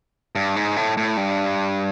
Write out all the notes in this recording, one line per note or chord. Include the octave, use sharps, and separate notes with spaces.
G2
G#2
A2
A2
G2